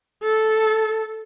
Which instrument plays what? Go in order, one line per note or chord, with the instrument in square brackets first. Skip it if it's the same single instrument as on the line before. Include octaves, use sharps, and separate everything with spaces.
[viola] A4